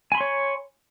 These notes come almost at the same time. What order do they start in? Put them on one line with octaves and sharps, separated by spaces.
G#5 B5 C6 C#5